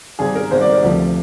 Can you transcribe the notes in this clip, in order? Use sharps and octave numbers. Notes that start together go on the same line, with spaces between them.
G#1 G#2 G3 G#4
A#4
G#1 G#2 G3 C5
D5
A#4
D2 C3 F3 G4